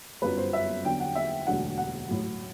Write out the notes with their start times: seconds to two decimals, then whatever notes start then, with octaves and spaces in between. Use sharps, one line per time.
0.22 G1 F#2 F#3 B4
0.38 C5
0.53 E5
0.84 E2 D3 F#3 G5
1.00 F#5
1.15 E5
1.46 E1 D2 D3 F#3 F#5
1.78 F#5
2.09 A1 A2 F#3